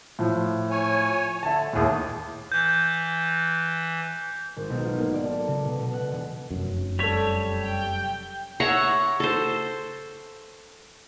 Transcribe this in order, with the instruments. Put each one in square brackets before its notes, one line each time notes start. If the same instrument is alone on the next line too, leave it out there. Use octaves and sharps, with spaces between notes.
[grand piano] A2 F3
[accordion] C#5 G#5
[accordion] D3 [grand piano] E5 A5
[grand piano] D#2 A2 [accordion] G#4
[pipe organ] E3 [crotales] G6
[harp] G#1
B1
F4
A#3
D5
A4
C#3
B2
B2
F#5
E1
[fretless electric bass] F1 F#2
[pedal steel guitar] G3 C#5 [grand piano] A4 B6
[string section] G5
[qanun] C#5 E5 F#5 A#5
A4 C5